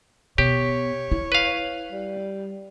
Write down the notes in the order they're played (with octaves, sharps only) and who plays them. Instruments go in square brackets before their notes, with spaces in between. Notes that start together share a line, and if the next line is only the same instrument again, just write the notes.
[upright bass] B2 [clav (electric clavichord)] G4 [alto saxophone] C#5
[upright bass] E4
[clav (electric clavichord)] B4 F5
[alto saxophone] G3